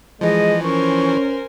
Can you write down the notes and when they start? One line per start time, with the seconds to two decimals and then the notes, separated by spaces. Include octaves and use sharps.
0.21 E3 F3 G#3 D#5
0.63 C#4 A#4 C5 G#5 C#6